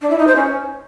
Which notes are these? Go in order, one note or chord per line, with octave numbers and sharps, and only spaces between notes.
D4
E4
D#4
C5
C#4